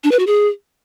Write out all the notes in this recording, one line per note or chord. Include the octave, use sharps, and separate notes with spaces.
D4
B4
F#4
G#4